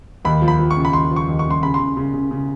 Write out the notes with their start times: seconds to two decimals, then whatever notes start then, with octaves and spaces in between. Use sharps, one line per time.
0.25 D#2 B5
0.42 F3
0.48 B5
0.59 F3
0.71 C#6
0.77 C#3
0.85 B5
0.93 D#2 C6
1.11 F3
1.16 C#6
1.28 D#2
1.39 C#6
1.45 C#3
1.51 C6
1.62 C#3 B5
1.74 C6
1.79 C#3
1.97 C#3
2.14 C#3
2.31 C#3